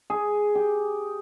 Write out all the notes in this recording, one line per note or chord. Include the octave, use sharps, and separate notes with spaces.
G#4
G4